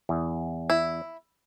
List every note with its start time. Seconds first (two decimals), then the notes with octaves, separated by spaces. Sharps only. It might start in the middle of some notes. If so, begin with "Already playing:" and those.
0.09 E2
0.70 E4